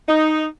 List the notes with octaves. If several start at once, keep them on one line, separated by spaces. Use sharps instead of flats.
D#4